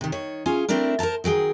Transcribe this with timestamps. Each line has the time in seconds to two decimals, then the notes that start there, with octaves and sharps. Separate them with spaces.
0.01 C3 D#3
0.12 D#3 C#5
0.46 C#4 F4 G#4
0.69 A3 C4 D4 E4 A#4
0.99 A#4 C5 F5 A5 A#5
1.24 D#3 F#3 G#4 G5